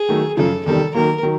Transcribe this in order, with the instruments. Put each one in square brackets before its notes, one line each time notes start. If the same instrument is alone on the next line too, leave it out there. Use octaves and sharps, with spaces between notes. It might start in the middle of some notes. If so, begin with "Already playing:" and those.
Already playing: [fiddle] G#4
[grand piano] D#3 F#3 A3
[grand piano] F#2 C#3 F3 [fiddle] A4
[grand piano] E2 C3 D#3 G3 [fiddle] A4
[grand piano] D#3 F#3 A#3 [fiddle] A#4
[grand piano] D#3 F#3